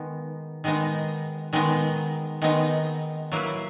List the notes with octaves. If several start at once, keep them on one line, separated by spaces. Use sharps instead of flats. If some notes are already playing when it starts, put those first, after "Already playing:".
Already playing: D#3 G#3 B3 D#4
D#3 G#3 B3 D#4
D#3 G#3 B3 D#4
D#3 G#3 B3 D#4
F#3 A#3 E4 B4